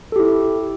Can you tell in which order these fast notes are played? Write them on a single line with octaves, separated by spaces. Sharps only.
A4 G4 E4